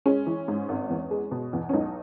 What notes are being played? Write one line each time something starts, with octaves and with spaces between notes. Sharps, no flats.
G#3 C#4
E3
G#2
G#1
E2
G#3
B2
E2
C#4
B1 D#4